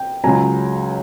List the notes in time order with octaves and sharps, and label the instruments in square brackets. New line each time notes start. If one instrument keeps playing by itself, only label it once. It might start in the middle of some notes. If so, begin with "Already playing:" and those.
Already playing: [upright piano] G5
C#2 C#3 F#3 G#5 A#5